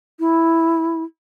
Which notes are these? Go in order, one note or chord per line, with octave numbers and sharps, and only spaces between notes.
E4